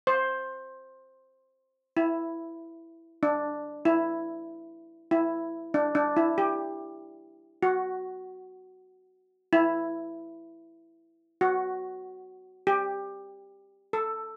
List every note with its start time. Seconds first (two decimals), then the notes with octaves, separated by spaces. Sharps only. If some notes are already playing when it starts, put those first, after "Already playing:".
0.07 C5
1.97 E4
3.23 D4
3.85 E4
5.11 E4
5.74 D4
5.95 D4
6.17 E4
6.38 G4
7.63 F#4
9.53 E4
11.41 F#4
12.67 G4
13.93 A4